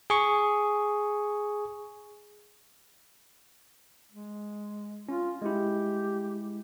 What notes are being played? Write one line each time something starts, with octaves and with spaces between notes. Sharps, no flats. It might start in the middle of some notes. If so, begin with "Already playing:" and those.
G#4 C#6
G#3
C#4 F4
G#3 E4 G4